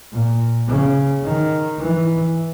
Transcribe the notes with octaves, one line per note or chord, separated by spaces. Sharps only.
A#2
C#3
D#3
E3